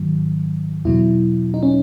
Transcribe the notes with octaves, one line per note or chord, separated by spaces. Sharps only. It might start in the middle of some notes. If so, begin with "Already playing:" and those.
Already playing: G#2 D#3 F#3
E2 B2 F#3 E4
D#4
C#4